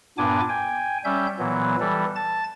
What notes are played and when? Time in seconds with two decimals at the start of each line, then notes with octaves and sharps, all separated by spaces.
0.18 G2 A#2 B3 D4 G#5 D6
0.49 G5 G#5
1.05 G3 C#4 E5 G6
1.39 A#2 E3 F#3 B3
1.80 E3 G3 A4
2.16 A5 A6